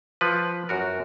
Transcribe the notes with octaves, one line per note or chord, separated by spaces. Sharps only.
F3 B4
F#2 F#4 A#4